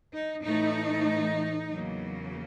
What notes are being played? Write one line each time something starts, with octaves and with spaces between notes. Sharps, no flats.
D#4
A2 E3 A3 D#4
E2 C#3 F#3 A#3